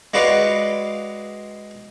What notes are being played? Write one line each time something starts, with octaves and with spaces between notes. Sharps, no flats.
G#3 F#4 B4 D5 F5